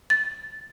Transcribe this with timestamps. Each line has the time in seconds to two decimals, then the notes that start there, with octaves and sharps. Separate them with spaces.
0.10 A6